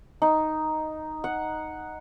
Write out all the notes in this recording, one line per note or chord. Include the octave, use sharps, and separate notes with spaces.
D#4
F#5